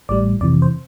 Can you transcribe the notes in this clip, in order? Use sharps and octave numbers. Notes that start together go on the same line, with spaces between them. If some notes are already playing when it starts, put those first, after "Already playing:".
A1 A2 G3 D5
F2 C3 E3 D5
C5